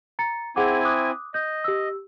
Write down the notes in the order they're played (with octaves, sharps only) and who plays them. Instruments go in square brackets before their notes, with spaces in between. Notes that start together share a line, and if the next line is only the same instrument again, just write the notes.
[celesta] A#5 A6 C#7
[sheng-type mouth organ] C4 E4 G#5 [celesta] G#4 F#5 D6
[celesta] D6 D#6 F#6
[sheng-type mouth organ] D#5 [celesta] G6
[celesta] G4 E6